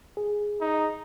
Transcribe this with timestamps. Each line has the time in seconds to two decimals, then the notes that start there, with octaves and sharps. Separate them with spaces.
0.17 G#4
0.61 D#4